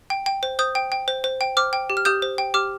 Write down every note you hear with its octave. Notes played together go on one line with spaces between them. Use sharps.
G5
G5
C5
C5 D#6 G6
G5
G5
C5
C5
G5
C5 D6 F6
G5
G4
F6
G4 D#6 G6
C5
G5
G4 D6 F6